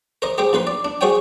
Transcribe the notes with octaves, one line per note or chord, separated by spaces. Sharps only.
A#4 C5 D#5
G4 G#4 C5 G5
A#1 D#4 B4 C6
D5
D4
F#4 G#4 C5 C#5 G5 G#5